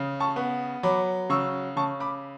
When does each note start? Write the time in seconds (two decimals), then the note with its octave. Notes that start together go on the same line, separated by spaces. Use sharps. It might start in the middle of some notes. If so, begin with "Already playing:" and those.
Already playing: C#3
0.20 A5 C#6
0.36 B3
0.83 F#3 B5 D6
1.29 C#3 C#6 E6
1.76 C#3 A5 C#6
2.00 B5 D6